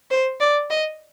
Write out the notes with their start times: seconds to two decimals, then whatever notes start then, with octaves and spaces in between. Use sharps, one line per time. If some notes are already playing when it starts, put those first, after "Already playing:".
0.11 C5
0.40 D5
0.70 D#5